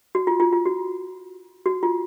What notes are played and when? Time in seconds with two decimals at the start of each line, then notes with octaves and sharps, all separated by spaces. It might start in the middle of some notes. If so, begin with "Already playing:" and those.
0.15 F#4
0.27 F4
0.40 F4
0.53 F4
0.65 F#4
1.66 F#4
1.83 F4